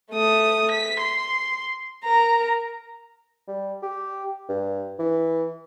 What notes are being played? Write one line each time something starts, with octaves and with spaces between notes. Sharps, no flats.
A3 D#6
B6
C6
A#4 A#5
G3
G4
G2
E3